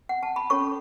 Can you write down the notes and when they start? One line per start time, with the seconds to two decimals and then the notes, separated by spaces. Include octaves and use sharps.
0.09 F#5
0.23 A5
0.36 B5
0.50 C#4 A4 C#5 C#6